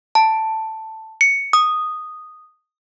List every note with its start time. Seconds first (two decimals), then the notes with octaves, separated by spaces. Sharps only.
0.15 A5
1.21 C#7
1.53 D#6